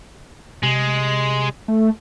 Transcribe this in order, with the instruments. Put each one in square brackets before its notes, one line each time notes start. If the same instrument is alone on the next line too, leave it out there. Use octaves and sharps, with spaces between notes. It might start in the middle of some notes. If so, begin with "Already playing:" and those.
[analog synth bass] C3 [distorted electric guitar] G#3
[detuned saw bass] A3